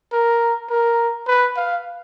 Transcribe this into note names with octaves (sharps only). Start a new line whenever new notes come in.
A#4
A#4
B4
F5